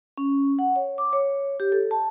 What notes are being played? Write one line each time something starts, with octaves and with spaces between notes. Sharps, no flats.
C#4
F#5
C#5
D6
C#5
G4
A4
A5